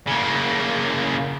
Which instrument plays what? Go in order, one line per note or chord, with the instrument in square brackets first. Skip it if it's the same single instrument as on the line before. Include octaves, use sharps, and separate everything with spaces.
[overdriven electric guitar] C#3 A#3